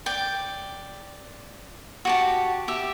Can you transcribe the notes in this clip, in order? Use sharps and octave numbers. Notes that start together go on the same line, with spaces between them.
D5 G5
F#4 G4 A5
G4 E5